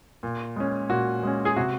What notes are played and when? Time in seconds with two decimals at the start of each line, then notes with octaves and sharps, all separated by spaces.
0.23 A#2
0.56 G#3 C#4
0.89 A#2 F#4
1.23 G#3 C#4
1.45 G#4
1.56 C3 F#4